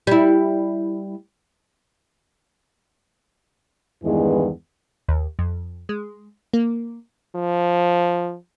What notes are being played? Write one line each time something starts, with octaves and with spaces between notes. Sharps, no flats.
G3 E4
E2 G2 D#3 E3 G#3 B3
D#2
F2
G#3
A#3
F3